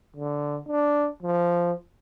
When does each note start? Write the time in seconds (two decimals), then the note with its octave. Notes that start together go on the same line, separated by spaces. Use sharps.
0.16 D3
0.67 D4
1.23 F3